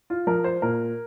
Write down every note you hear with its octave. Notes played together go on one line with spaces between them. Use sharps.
F4
F3 A#4
C5
A#2 A#4